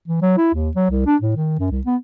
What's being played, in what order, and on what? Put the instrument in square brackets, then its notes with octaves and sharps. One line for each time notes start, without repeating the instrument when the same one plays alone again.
[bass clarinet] E3
F#3
E4
D#2
F#3
C2
D4
A2
D#3
F#2
C2
B3